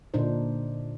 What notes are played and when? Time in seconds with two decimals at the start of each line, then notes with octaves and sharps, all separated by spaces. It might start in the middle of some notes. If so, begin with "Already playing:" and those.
0.14 A#2 D3 D4 D#4 C5